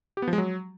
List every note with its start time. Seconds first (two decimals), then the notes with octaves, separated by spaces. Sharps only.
0.17 G4
0.22 B3
0.28 F3
0.33 G#3
0.38 F#3